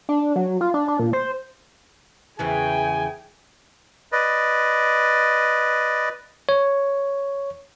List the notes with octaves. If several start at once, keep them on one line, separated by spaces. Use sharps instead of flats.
D4
F#3
F4
D4
D4
A#2
C5
E2 C#3 E3 G#4 G5 G#5
B4 D5 D#5
C#5